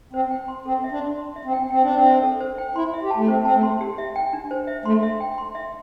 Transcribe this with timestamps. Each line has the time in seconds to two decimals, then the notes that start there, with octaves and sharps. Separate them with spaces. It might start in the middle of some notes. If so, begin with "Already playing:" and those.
0.13 C4 C5
0.31 G5
0.48 C6
0.65 C4 A4
0.84 E5
0.92 D4
1.01 C6
1.18 C6
1.36 E5
1.45 C4
1.53 G5
1.70 C4 G5
1.83 D4
1.89 C5
1.94 C4
2.06 E5
2.23 A4
2.41 C5
2.58 G5
2.76 E4 C6
2.94 E5
3.02 G4
3.11 A5
3.16 A3
3.28 C4 C5
3.44 C4 A5
3.54 A3
3.63 C6
3.81 G4
3.98 E5
4.16 G5
4.33 D4
4.51 C5
4.67 E5
4.85 A3 C6
5.03 E5
5.20 G5
5.38 C6
5.55 E5